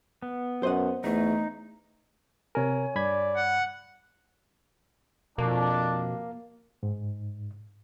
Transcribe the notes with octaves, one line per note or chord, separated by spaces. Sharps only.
B3
F#2 C5 D#5 F#5
E2 A3 D#4
C3 A#4 C#5 G#5
G2 D5 B5 G#6
F#5
F2 B2 F3 A#3 D4
G#2